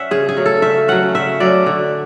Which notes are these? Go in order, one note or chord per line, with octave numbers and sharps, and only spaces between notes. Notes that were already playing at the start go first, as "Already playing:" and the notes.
Already playing: C#4 E5 F#5
C#3 G#4
G#4
F#3 A3 C#4
A4
C#3 E5
F#3 A3 C#4 F#5
C#3 E5
F#3 A3 C#4 D5
D3